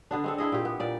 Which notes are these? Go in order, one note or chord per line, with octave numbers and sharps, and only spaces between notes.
D3 B3 D4
G#3 C4 A4
D4 E4 G#4 D#5
A#2 G4
B3
A#2 D5